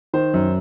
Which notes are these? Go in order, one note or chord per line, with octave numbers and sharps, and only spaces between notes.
D#3 C5
F#2